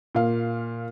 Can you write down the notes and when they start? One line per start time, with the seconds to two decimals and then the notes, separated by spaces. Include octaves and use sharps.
0.15 A#2 F5